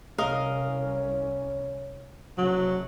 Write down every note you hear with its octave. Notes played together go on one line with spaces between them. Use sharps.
C2 C#4 A#4 D#5 F5
F#1 C3 F#3